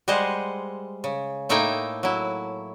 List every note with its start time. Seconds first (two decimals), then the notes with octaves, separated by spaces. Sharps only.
0.08 G3 G#3 G#4 C5 D#5 F#5
1.04 C#3
1.49 A2 A3 A#3 D#4 E4 G5
2.03 F#3 E4